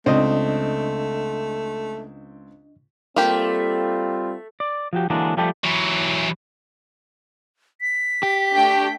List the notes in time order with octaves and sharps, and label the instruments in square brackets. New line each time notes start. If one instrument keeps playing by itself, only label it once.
[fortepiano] C#2 C4 [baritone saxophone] A3 [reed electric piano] D4 D#5
[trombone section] G3 C4 F4 [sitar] A3 [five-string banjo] A#3 G4
[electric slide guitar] D5
F3 F#4 G4
D3 E3 F#3 G#3 A#3 D4
F3 G3 A3 G4 A4
[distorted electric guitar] E3 F#3
[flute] B6
[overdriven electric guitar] G4
[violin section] A3 D4 G5